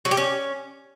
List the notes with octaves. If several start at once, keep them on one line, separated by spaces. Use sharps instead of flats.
F#3
G4
C#4